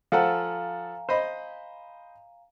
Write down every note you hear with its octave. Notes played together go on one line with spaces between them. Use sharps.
F3 A4 F5 F#5 G#5 A#5
C5 D#5 B5